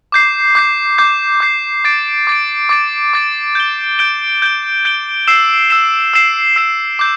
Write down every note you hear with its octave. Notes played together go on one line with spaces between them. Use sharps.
D6 G6 C7
D6 G6 C7
D6 G6 C7
D6 G6 C7
D6 A6 D7
D6 A6 D7
D6 A6 D7
D6 A6 D7
G6 D7 G7
G6 D7 G7
G6 D7 G7
G6 D7 G7
E6 C7 E7
E6 C7 E7
E6 C7 E7
E6 C7 E7
D6 G6